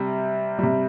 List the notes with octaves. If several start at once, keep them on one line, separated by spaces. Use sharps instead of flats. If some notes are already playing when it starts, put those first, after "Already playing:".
Already playing: C3 G3
C3 G3